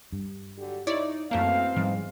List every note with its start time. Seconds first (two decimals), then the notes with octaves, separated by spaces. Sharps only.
0.12 G2
0.57 D3 F#3 G4
0.87 D#4 E4 C#5 D5
1.31 F#2 E3 A3 A#3 C4 F5
1.77 G#2 F3 G3 B3